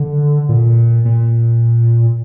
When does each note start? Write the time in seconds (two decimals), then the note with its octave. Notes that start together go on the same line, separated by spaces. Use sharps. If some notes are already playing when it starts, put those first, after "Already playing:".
Already playing: D3
0.49 A#2
1.05 A#2